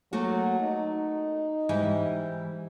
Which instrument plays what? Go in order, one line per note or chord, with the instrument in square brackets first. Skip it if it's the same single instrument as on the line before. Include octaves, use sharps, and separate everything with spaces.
[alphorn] F#3 [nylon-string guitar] A3 A#3 F#4
[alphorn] D#4
[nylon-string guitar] G#2 E3 G3